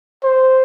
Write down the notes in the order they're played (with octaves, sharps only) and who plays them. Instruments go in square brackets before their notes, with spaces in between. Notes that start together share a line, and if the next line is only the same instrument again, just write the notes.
[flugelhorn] C5